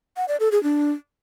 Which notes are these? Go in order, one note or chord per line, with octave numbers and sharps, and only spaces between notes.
F#5
D5
A4
G#4
D4